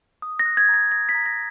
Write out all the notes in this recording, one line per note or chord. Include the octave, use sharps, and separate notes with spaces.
D#6
A#6
F#6
G#6
A#5
A#6
D#6 A#6
B6
A#5
A#6